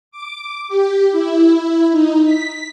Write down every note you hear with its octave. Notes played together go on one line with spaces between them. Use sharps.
D6
G4
E4
D#4
B6